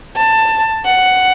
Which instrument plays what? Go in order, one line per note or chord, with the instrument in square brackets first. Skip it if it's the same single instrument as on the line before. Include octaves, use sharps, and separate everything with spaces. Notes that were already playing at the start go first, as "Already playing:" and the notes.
[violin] A5
F#5